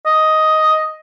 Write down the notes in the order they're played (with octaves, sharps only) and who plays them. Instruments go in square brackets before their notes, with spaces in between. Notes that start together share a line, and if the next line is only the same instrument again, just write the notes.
[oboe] D#5